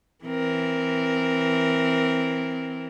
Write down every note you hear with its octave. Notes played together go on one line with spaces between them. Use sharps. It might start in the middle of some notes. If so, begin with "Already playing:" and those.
E3 C4 A#4